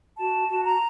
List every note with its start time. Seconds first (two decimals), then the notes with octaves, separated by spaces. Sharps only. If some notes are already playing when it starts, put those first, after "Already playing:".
0.17 F#4 A5
0.48 F#4
0.63 A#5